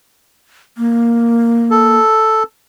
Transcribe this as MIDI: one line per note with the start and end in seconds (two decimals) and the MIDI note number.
0.78 1.97 58
1.71 2.43 69